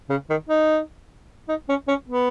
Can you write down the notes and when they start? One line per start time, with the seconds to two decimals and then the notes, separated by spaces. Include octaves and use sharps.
0.09 C#3
0.29 D#3
0.49 D#4
1.48 D#4
1.69 C#4
1.88 C#4
2.08 B3